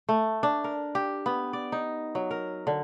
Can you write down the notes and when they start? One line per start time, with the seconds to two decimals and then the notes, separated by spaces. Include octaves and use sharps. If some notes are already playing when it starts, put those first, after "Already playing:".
0.09 A3
0.43 D4
0.64 A#4
0.95 G4
1.26 B3
1.53 D5
1.72 D#4
2.15 F#3
2.31 A#4
2.67 D3